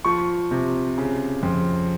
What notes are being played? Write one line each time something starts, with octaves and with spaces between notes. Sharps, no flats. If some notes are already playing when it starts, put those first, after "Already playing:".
F3 C#6
C3
C#3
F2